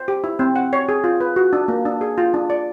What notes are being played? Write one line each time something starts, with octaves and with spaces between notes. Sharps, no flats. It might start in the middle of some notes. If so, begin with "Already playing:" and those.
Already playing: C5
G4
E4
C4
F#5
C#5
G#4
F4
B4
F#4
D4
A#3
D4
G#4
F4
D4
D5